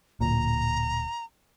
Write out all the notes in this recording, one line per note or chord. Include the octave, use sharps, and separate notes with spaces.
D1 A#2 A#5